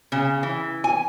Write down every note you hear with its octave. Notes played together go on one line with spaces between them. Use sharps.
C#3
E3
G#5